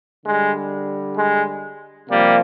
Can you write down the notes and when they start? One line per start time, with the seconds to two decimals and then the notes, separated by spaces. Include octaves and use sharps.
0.24 D3 G3 G#3
1.16 G#3
2.09 C3 F3 G3 A#3